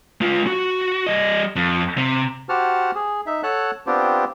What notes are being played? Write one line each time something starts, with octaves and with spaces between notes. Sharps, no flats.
G#3 F4
F#4
G3 D#5
F2
C3
F#4 G4 C5 F#5 A5 F6
G#4
D#4 E5
A4 C#5 F#5 A5 F#6
B3 C4 D4 F4 G4 C5